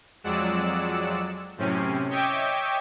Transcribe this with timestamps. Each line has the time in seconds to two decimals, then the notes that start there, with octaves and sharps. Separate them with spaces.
0.24 F2 F#3 G#3 D5 F#5 E6
1.57 F#2 A2 C3 C4 C#4
2.09 C#5 D#5 E5 G5 C#6 D6